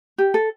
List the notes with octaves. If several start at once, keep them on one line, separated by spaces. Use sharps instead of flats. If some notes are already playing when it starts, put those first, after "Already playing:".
G4
A4